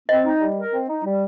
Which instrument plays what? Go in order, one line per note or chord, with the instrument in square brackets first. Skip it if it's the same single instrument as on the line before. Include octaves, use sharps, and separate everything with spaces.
[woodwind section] C4 [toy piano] D#5
[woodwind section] D#4
G3
A#4
C4
D#4
G3